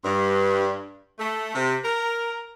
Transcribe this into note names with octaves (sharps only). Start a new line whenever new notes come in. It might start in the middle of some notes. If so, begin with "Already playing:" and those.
G2
A3
C3
A#4